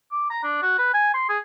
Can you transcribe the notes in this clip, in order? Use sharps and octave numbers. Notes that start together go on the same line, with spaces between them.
D6
A#5
D4
F#4
B4
G#5
C6
G#4